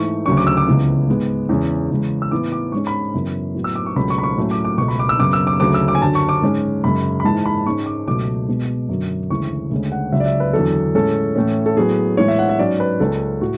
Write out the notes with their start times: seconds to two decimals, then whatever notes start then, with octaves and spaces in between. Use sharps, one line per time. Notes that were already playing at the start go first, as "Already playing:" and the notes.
Already playing: G#2 E3 A3 C#6
0.26 D2 C#3 F#3 C#4 C#6
0.37 D6
0.47 E6
0.57 D6
0.67 C#2 C#3 E3 B3
1.09 G#2 G#3 B3
1.49 E2 C#3 G#3 C#4
1.91 E2 C#3 G#3
2.22 E6
2.31 A2 E3 B3 D6
2.52 D6
2.72 G#2 G#3 C#4 C#6
2.87 B5
3.14 F#2 C#3 E3 B3
3.55 A2 F#3 B3
3.64 E6
3.75 D6
3.86 C#6
3.96 C#2 B2 F#3 A3 C#4 B5
4.10 C#6
4.18 B5
4.23 C#6
4.37 A2 F#3 A3 C#4
4.51 D6
4.65 D6
4.78 C#2 B2 A3 C#6
4.88 B5
4.99 D6
5.09 E6
5.19 F#2 C#3 F#3 B3 D6
5.33 E6
5.47 D6
5.60 D2 C#3 F#3 A3 D6
5.74 E6
5.88 D6
5.95 G#5
6.02 F#2 D3 F#3 A5
6.15 C#6
6.29 D6
6.42 G#2 G#3 C#4
6.84 F#2 C#3 G#3 B5
7.20 B5
7.24 G#2 E3 G#3 A5
7.46 B5
7.66 G#2 G#3 C#4 C#6
7.86 D6
8.07 C#2 B2 F#3 A3 D6
8.48 B2 G#3 B3
8.89 F#2 D3 F#3
9.30 D2 C#3 E3 G#3 C#6
9.71 D2 C#3 G#3 C#4
9.92 F#5
10.12 C#2 C#3 F#3 E5
10.20 D5
10.26 E5
10.40 B4
10.53 E2 D3 F#3 B3 A4
10.94 A2 G#3 C#4 A4
11.35 A2 E3 A3 C#4
11.66 A4
11.77 A2 F#3 B3 G#4
12.17 A2 E3 G#3 B3 C#5
12.28 E5
12.39 F#5
12.49 E5
12.59 G#2 F#3 C#4 D5
12.80 B4
13.00 C#2 C#3 G#3 C#4 A4
13.41 A2 F#4